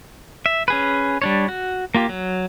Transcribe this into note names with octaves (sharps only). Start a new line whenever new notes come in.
E5
C#4 G#4 B4
G3 D4 C#5
F#4
A#3 F4 G4
F#3